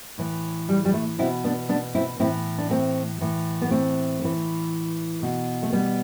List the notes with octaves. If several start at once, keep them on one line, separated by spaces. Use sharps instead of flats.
A2 E3
G3
G3
A3
B2 C4 E4
B3 D4
B3 D4
C4 E4
A2 E3 C4 E4
D4
A3 C4
A2 E3
B3
A3 C4
A2 E3
B2
A3
G3 B3